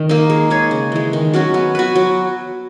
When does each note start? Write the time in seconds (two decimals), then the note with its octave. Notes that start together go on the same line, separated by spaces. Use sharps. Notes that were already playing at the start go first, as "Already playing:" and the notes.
Already playing: D#3
0.09 A#3 D#4
0.30 G#3
0.50 D#4 G#4 C#5
0.71 C#3
0.92 E3 G#3
1.13 D#3
1.34 F#3 C#4 F#4
1.54 B3
1.75 F#4 B4
1.95 F#3